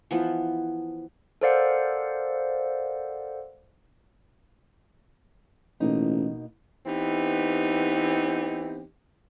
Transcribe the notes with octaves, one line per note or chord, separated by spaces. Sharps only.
E3 F3 B3
A4 A#4 C5 D5 F5 F#5
A1 B2 A#3 D#4
E3 B3 C4 D#4 G4